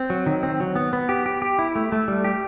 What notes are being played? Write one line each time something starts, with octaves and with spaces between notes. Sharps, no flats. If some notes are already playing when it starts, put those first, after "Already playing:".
Already playing: C4
F#3
D#3
C4
F#3
B3
B3
G4
G4
G4
E4
A3
A3
G3
G4